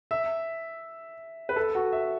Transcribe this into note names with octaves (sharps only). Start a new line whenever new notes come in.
E5
B4
A4
F#4
E5